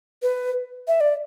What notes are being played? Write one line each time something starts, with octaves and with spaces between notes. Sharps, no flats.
B4
E5
D5